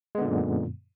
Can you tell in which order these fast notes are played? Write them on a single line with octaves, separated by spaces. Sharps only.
G#3 B3 D3 A#2 F#2